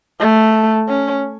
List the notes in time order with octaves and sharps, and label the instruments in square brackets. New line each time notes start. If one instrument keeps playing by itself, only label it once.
[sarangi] A3
C#4